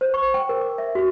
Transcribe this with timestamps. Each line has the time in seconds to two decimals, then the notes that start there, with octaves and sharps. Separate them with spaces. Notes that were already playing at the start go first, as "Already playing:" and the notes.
0.01 C5
0.14 C#6
0.34 G5
0.49 A#4
0.61 D6
0.78 E5
0.95 F#4